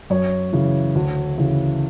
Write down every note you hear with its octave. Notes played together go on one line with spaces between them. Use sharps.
F#2 C#5
C#3 E3
D2
C#3 E3